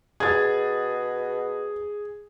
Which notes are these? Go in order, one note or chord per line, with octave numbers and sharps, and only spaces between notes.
B2 G#4 G#6 A6